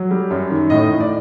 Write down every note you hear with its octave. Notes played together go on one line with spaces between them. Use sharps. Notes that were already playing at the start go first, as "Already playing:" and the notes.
Already playing: F#3
G3
F#2
D#3
A2 D#5
A2
D5